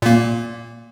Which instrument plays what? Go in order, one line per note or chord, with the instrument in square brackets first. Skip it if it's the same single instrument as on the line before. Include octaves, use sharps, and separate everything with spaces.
[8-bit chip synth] A#2 A#3